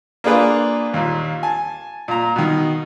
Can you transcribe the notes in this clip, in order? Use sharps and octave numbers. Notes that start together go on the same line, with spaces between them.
A#3 D4 F4 G#4 B4 F5
D#2 A#2
G#5 A5
A#2 A#5
B2 D#3